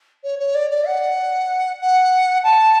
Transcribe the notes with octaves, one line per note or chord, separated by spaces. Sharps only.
C#5
C#5
D5
D5
F#5
F#5
A5